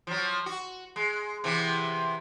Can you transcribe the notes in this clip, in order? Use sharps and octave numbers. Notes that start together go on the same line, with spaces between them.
F3 F#3
F#4
G#3
C3 E3 B3